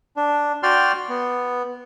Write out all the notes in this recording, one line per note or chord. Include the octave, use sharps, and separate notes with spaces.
D4
F#4 D5 G5 C6 F6
B3